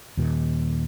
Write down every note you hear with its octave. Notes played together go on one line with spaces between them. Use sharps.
D#2 A#2 D#3